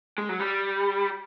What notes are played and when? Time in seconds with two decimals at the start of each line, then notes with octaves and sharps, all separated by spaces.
0.18 G#3
0.29 F#3
0.40 G3